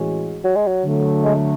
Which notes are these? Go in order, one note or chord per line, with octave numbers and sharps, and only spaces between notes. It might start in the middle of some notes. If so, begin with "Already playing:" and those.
Already playing: A2 E3 G#3 C#4 F#4
F#3
G#3
F#3
D3 F#3 A3
G#3